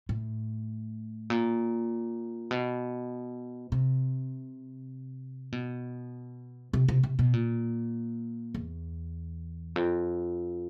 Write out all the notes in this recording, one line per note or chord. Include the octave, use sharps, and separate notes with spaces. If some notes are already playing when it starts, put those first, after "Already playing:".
A2
A#2
B2
C3
B2
C3
C3
C3
B2
A#2
E2
F2